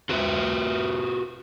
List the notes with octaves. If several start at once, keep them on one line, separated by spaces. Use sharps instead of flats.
F4 F#4 B4 D#5 E5